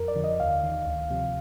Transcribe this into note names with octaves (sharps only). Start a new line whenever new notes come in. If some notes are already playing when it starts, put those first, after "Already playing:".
Already playing: F2 A#4
D5
D3 F3
D#5
D#2 F5
D#3
D2
C3 F3